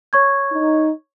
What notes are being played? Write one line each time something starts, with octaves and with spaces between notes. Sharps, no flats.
C#5 C#6 G#6
D#4